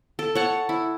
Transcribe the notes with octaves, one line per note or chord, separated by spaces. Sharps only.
A4
C#5 F#5 A5
E4